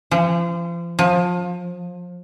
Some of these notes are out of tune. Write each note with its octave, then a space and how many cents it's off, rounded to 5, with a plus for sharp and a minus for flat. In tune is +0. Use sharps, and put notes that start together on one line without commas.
F3 -35
F3 +25